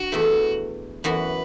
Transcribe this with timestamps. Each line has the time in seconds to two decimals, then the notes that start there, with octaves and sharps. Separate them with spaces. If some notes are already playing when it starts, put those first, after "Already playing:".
Already playing: D4 F#4
0.12 E2 E3 A3
1.04 F#2 E3 B3 F#4 B4